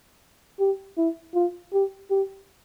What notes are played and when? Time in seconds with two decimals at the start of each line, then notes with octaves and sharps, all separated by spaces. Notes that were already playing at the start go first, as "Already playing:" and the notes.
0.60 G4
0.97 E4
1.35 F4
1.73 G4
2.11 G4